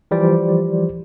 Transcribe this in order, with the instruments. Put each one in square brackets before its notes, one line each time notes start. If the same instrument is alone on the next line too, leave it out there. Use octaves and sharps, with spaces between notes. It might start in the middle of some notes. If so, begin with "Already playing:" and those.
[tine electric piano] E3 F3 G3 C5 D5